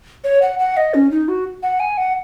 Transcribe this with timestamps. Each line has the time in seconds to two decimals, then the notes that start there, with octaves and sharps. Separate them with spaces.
0.24 C#5
0.42 F#5
0.59 F#5
0.77 D#5
0.94 C#4
1.11 D#4
1.28 F#4
1.63 F#5
1.80 G#5
1.97 F#5